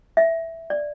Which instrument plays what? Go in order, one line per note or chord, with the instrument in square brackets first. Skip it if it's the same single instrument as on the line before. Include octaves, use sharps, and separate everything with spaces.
[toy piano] E5
D5